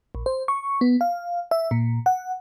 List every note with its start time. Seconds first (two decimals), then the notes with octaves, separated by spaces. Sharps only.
0.15 A#1
0.26 C5
0.48 C#6
0.81 B3
1.01 F5
1.51 E5
1.71 A#2
2.06 F#5